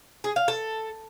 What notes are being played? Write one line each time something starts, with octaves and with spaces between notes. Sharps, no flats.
G#4
F5
A4